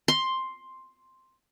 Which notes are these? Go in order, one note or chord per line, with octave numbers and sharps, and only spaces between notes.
C6